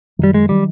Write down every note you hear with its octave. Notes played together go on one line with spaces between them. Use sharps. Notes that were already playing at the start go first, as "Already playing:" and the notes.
F#2 D#3 F#3 G3
G#3
D#3 F#3 G3